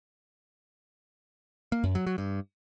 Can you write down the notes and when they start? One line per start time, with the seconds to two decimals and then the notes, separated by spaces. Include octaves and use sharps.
1.72 A#3
1.84 F#2
1.95 F#3
2.07 F#3
2.18 G2